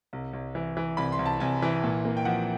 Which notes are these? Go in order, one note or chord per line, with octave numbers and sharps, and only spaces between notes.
C2
C2
E3
E3
C2 B5
C6
C2
A5
C2 G#5
E3
A#2
A#3
G5
F3 F#5